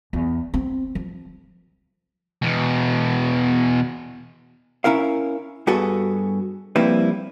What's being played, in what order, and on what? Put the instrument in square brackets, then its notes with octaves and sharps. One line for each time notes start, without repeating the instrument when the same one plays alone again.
[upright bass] E2
C4
F3
[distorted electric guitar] E2 B2
[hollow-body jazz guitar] C#4 E4 A#4 F5
G2 B3 F#4 G#4 A4
F3 G3 A#3 C4 E4 B4